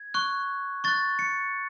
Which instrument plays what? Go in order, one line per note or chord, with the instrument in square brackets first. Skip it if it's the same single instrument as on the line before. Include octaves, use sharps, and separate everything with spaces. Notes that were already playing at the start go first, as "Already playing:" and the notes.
Already playing: [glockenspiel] G#6
C#6 F#6
C#6 F#6 A6
C#7